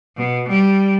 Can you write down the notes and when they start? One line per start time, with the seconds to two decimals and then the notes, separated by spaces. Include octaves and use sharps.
0.17 B2
0.48 G3